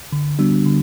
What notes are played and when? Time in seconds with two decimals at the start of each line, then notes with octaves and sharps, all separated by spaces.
0.13 D3
0.39 G3 B3 D4 F#4
0.66 D3